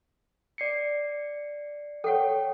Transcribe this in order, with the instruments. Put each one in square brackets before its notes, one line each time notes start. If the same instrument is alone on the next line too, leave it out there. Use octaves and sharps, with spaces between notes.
[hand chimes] D5 C7 C#7
[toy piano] A4 F#5 [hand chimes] C#5 G5